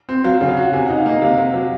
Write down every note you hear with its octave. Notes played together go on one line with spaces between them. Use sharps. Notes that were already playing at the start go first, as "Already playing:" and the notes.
C4
F#3 F5
C#3 F#5
F5
F#4 F#5
C3 G#5
D#4 F#5
F5
A#3 D#5
C3 F5
C3
F#3